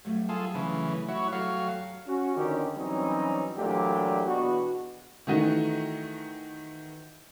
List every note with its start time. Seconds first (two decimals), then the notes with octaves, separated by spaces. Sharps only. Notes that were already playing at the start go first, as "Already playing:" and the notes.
0.05 G2 F#3 A3
0.29 F4 G#4 A4
0.55 C#3 E3
1.08 E4 F#4 C#5
1.32 F#3 G4 A4 F5 C#6
2.07 C#4 F#4
2.36 F2 D3 D#3 C#4 G4
2.76 E3 F#3 G3 C4 C#4 D#4
3.57 A#2 E3 F#3 A3 D4 G4
4.26 E2 B2 B3 D4 F#4
5.27 D#3 E3 A3 D#4 F#4